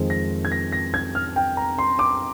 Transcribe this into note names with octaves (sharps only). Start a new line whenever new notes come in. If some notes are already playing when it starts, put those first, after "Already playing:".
Already playing: F2 D#3 G#3 C4
A#6
G#6
A#6
A#6
G#6
F6
G5
A#5
C6
D6